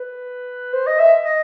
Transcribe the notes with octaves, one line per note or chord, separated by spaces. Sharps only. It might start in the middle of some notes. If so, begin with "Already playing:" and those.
Already playing: B4
C5
D#5
E5
D#5